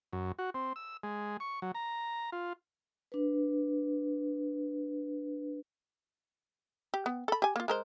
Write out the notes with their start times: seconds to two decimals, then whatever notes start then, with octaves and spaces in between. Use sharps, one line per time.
0.13 F#2
0.39 F#4
0.54 C4
0.76 E6
1.03 G#3
1.40 C#6
1.62 F#3
1.75 A#5
2.32 F4
3.12 D4 B4
6.94 G4
7.06 B3
7.28 A4 B5
7.42 G4 G#5
7.56 A#3 F4
7.68 G#3 A#4 C5